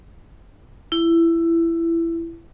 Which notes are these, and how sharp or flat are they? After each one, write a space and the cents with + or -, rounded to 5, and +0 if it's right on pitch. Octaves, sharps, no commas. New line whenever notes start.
E4 +15